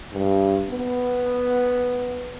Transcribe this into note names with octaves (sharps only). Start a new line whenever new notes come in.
G2
B3